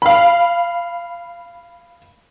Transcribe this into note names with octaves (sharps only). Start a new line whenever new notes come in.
F5 B5